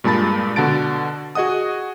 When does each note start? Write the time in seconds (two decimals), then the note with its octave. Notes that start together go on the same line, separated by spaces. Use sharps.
0.04 G2 A#2 G#3 A5 B5 A6
0.56 B2 D3 F#4 A5 A6 D7
1.35 F#4 G#4 D#5 F#5 D#6